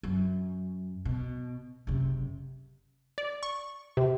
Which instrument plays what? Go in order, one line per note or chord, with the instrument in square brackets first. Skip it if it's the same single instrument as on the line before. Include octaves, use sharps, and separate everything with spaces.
[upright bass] F#2
B2
F#1 C3
[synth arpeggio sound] D5
C#6
C3